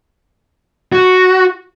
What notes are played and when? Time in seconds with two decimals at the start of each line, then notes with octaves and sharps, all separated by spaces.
0.92 F#4